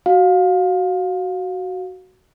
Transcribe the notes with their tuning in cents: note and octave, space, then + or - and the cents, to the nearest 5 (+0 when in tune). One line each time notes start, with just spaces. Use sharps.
F#4 +10 F5 +25